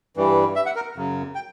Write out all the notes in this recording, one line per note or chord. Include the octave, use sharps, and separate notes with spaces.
G2 E3 G3
E5
F#5
A#4
F#2 C#3 F#3
G5